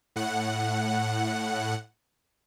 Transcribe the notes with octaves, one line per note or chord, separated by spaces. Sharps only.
A2 F#5